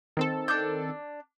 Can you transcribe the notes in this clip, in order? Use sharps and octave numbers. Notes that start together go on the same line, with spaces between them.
D#3 C4 A4
D4 D6 G6